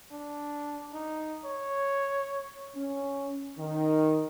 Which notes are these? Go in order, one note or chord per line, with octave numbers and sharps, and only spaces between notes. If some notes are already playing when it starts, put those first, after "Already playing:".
D4
D#4
C#5
C#4
D#3